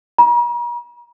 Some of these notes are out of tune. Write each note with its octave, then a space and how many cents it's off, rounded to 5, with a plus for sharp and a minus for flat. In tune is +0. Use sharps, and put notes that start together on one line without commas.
A#5 +45